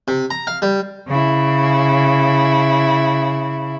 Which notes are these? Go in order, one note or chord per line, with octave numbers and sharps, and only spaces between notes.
C3
A#5
F5
G3
C#3 E4